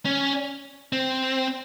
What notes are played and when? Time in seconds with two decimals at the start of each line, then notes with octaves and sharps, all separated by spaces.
0.05 C#4
0.93 C4